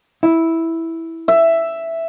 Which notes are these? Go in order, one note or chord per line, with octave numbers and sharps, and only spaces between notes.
E4
E5